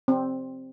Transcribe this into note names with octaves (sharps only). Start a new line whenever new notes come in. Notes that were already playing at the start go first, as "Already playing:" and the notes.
C4